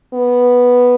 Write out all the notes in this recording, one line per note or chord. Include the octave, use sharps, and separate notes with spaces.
B3